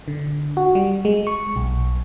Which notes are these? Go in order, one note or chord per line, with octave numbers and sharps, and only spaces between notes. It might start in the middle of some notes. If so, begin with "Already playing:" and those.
D3
F#4
G3
G#3
C#6
B1